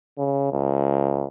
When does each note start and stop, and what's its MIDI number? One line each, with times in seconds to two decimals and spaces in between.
0.18 0.52 49
0.52 1.25 37